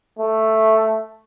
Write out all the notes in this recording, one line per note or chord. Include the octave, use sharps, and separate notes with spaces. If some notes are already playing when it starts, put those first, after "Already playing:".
A3